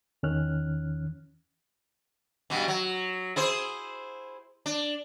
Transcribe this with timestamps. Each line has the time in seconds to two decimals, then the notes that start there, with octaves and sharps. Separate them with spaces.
0.23 E2 D#3 E3 C#4 F6 F#6
2.50 G2 B2 E3
2.68 F#3
3.36 E4 G#4 C5
4.66 D4